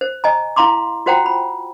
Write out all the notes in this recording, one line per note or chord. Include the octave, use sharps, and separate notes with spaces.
C5
D#5 G#5 A#5
E4 F5 A#5 C6 D6
F4 F#4 C5 F#5 G5 A#5
B5